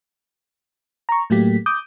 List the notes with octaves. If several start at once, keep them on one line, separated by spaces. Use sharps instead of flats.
A#5 C#6
A2 F#3 A3 A#3 G4 B6
D6 D#6 G6